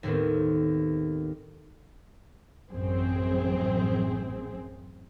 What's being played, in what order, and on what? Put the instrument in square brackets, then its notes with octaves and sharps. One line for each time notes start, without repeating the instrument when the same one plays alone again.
[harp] D#2 A2 D#3 B3 C4
[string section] A1 F#2 C4 G#4